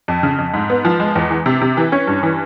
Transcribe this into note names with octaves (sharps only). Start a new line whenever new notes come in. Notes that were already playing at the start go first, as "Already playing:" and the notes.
F2
C#3
F2
G#2
B3
F3
G#3
E2
E3
C3
C3
E3
C#4
G2
E3